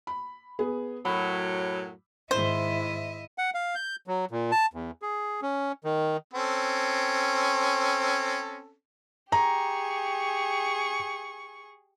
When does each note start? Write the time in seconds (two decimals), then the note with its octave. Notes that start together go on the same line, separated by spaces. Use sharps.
0.07 B5
0.59 B3 G#4
1.05 F#2 A2 F#3 B5
2.31 G#2 D#3 E4 C5 D#5 E5
3.38 F#5
3.54 F5
3.75 G6
4.07 F#3
4.31 A#2
4.52 A5
4.74 E2
5.02 G#4
5.42 C#4
5.84 D#3
6.34 C4 C#4 A4
9.32 G4 G#4 A#5 C#6